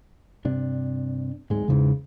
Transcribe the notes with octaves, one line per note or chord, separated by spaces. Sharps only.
G2 C3 D4
D1 G#2 G#3
E2 G#2 C#3 E3